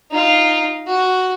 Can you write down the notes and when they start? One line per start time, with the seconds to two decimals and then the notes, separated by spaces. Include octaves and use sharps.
0.11 D#4 F4
0.86 F#4